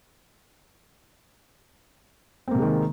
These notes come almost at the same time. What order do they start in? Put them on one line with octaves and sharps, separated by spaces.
C4 A#3 C3 G#3 D#3